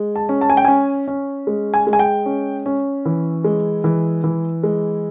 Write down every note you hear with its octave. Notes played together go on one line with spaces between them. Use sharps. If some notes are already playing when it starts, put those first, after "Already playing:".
Already playing: G#3
A5
C#4
A5
G#5
G5
C#4 G#5
C#4
G#3
G#5
G#3
G#5
G5
C#4
C#4
E3
G#3
E3
E3
G#3